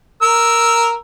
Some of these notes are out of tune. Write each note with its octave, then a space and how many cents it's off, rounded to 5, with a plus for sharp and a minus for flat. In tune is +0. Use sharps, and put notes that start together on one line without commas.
A#4 +0 E6 -5